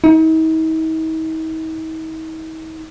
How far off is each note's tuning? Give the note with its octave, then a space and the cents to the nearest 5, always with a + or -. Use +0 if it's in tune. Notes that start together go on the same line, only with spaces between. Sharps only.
D#4 +45